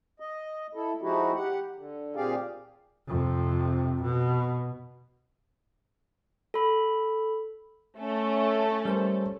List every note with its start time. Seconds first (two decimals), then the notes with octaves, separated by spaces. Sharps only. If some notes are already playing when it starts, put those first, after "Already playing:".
0.20 D#5
0.75 E4 A4
1.02 F3 G#3 D#4 E4 F#4 G4
1.35 G4 F#5
1.76 D3
2.16 A#2 C4 G4 G#4 D5 F5
3.07 F2 C3
4.01 B2
6.54 A4 B5
7.98 A3 C#4 A4
8.85 G3 A#4 C5